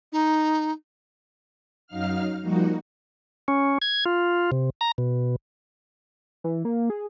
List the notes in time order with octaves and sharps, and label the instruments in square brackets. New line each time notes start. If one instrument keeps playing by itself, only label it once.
[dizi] D#4
[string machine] F#2 F#3 D#4 F5 F6
F3 G3 A#3 D#4 F#4
[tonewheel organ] C#4
G#6
F4
C3
A#5
B2
[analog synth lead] E3
A#3
G#4